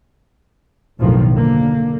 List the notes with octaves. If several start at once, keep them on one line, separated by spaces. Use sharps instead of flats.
F#1 B1 F2 A2 D#3 F3
D3 A#3